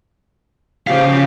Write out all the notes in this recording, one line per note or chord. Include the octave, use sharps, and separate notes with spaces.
C#3 F3 G4 F5